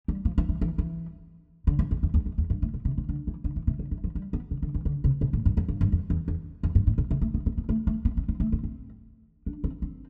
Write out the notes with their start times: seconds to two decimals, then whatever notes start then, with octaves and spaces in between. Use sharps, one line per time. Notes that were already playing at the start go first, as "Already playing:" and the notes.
0.08 G3
0.25 F3
0.38 E3
0.49 E3
0.61 E3
0.78 E3
1.67 D3
1.79 F2
1.91 E2
2.03 F2
2.14 E2
2.26 E2
2.38 E2
2.50 G2
2.62 A2
2.74 B2
2.85 C3
2.98 C3
3.09 D3
3.27 E3
3.44 D3
3.56 E3
3.67 C3
3.79 D3
3.91 E3
4.04 F3
4.15 G3
4.33 B3
4.51 C3
4.62 D3
4.74 E3
4.85 D3
5.04 C3
5.21 B2
5.33 A2
5.46 G2
5.57 F2
5.68 G2
5.81 G2
5.92 F2
6.10 E2
6.28 E2
6.63 F2
6.75 G2
6.87 A2
6.98 B2
7.11 C3
7.22 A3
7.34 B3
7.46 C4
7.58 B3
7.69 A3
7.87 A3
8.05 B3
8.17 C4
8.29 C4
8.40 A3
8.52 C4
8.63 C4
9.46 D4
9.64 C4
9.82 C4